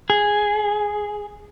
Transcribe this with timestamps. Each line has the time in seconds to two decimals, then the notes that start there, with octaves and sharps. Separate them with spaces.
0.10 G#4